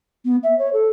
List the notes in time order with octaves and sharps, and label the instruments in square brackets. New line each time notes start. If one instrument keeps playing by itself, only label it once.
[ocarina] B3
E5
C#5
A4